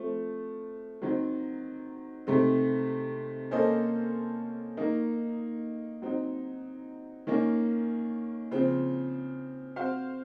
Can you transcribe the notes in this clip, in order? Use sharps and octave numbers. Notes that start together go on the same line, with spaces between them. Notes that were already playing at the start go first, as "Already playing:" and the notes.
Already playing: F3 A3 C4
D#3 F#3 C4
C3 D#3 A3 C4
A#3 C#4 A4 C5 D#5
D#3 A#3 D#4
F#3 C4 D#4
D#3 A#3 C#4
C#3 F3 C4
C4 F#4 C5 F5